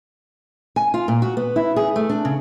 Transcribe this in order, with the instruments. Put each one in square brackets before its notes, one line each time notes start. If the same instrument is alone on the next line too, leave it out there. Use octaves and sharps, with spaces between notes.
[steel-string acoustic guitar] G#5
F4
A#2
F#4
B3
E4
G#4
A3
D4
C#3